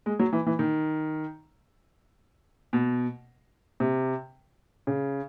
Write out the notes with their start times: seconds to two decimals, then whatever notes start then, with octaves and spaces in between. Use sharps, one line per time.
0.06 G#3
0.19 F#3
0.33 E3
0.46 E3
0.59 D#3
2.73 B2
3.80 C3
4.87 C#3